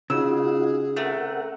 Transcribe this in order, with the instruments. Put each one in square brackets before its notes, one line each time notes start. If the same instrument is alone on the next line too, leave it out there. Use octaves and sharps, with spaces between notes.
[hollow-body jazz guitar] C#3 [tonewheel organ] D#4 F4 F#4 [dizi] G#4 [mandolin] E6
[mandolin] A3 C4 [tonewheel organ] A#4 F#5